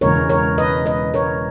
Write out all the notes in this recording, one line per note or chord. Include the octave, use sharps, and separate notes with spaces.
E1 E2 C#3 G#3 A#4 C#5
A#4 C#5
B4 D#5
B4 D#5
A#4 C#5